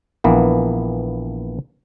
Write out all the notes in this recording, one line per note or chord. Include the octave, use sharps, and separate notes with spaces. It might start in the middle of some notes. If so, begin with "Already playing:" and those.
A#1 E3 A#3 B3